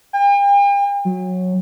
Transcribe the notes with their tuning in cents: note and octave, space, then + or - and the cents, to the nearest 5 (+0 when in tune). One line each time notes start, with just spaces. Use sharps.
G5 +45
F#3 -15